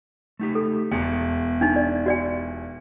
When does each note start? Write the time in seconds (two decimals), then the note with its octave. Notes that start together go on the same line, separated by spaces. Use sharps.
0.39 A3 D#4 G4
0.55 A4
0.92 E1 B3 G#4 G#5
1.61 D4 D#4
1.76 D5
2.06 F#4 D5 G#5